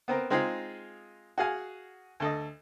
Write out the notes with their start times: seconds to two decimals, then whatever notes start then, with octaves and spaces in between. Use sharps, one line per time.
0.08 B3 C4 A#4
0.30 G#3 C4 D#4 F4 G#4
1.38 F#4 G#4 F5 G#5
2.20 D2 A4 D#5